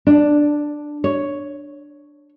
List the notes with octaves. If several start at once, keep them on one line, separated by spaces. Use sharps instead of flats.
D4
C#5